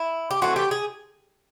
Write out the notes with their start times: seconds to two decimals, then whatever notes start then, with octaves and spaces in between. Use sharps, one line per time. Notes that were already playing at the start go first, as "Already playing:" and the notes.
Already playing: E4
0.31 G4
0.41 E3 A3 C4 F#4
0.56 G4
0.71 G#4